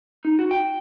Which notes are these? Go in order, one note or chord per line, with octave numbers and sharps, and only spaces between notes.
D#4
F#4
G5